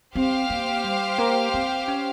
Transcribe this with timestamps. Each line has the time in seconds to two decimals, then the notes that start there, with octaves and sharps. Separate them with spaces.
0.15 C4 G4 C5 F5
0.50 A#3
0.84 G3
1.18 A#3
1.54 C4
1.88 C#4